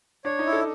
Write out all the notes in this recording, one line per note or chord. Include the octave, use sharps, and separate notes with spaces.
D4 C#5
D#4
E4
A4